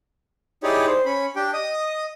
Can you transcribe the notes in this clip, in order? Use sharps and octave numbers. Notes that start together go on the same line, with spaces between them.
D#4 E4 G4 G#4 C#5 D5
C5
C#4 B5
D4 G4 G5
D#5 D#6